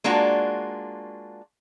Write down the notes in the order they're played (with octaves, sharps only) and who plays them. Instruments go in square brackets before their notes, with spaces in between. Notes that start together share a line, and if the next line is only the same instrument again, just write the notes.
[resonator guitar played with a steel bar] G#3 A#3 D4 F4 F#4